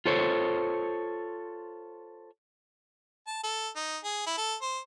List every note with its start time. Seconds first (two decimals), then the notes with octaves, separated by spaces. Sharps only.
0.06 F4 A4 C5 C#5
3.27 A5
3.44 A4
3.76 D#4
4.04 G#4
4.26 E4
4.38 A4
4.62 C5